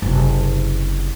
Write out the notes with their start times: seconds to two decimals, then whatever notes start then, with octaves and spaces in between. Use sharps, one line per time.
0.02 F#1 C3